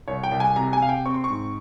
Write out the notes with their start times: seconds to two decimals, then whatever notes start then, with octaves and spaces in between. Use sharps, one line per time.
0.08 C2 C#5
0.24 G5
0.31 C2
0.40 G#5
0.56 C3 A#5
0.73 G#5
0.80 C3 F5
0.89 G5
1.06 C4 C#6
1.14 C6
1.24 C#6
1.30 G#2